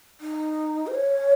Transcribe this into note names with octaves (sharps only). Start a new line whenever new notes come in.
D#4
C5
C#5